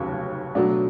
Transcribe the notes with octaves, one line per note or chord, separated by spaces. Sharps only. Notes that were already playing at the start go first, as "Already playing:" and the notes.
Already playing: F1 D#2 C#3 F#3
B2 F#3 A3 D4